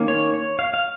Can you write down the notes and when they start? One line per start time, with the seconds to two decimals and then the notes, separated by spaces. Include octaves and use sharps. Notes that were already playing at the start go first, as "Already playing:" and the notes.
Already playing: D#3 A#3 C#4
0.08 C#5
0.34 C#5
0.59 F5
0.74 F5